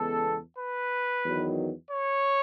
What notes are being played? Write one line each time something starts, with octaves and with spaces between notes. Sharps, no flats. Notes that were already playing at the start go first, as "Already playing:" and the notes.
Already playing: E2 C#3 G#3 B3 A4
B4
E2 D#3 F#3
C#5